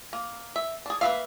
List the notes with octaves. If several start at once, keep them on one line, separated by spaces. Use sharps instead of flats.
A#3
E5
D4 G#4
A#3 B4 E5 F5